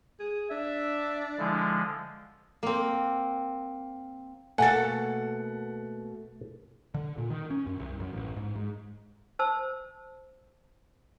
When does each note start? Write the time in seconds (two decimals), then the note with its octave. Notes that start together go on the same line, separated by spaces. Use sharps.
0.19 G#4
0.51 D4 E5
1.38 D3 F3 G#3 E4
2.63 A#3 C4
4.58 B2 A3 A#3 A4 F#5 G#5 A6
6.94 D3
7.18 A#2
7.30 D#3
7.51 C#4
7.67 F#2
7.79 C2
8.00 F#2
8.13 A1
8.37 G#2
8.56 G#2
9.39 C5 A5 E6